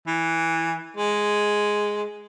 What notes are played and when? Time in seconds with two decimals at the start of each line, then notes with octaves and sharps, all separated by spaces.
0.07 E3
0.97 G#3